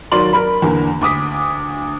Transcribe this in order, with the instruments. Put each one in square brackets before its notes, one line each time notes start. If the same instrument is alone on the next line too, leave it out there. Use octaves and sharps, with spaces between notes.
[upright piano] D#2 F#3 A#4 D5 C6 F#7
A#4 B5
E2 D3 A#3
D2 D6 D#6 B6